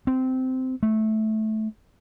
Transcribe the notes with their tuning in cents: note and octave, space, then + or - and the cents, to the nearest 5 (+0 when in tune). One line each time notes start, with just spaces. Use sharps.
C4 -15
A3 -15